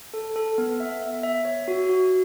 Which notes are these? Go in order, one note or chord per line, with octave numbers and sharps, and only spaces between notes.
A4
A4
B3
E5
E5
E5
C#5
F#4
F#4